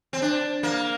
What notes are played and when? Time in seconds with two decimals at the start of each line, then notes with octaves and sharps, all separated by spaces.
0.13 C4
0.22 D4
0.63 A#3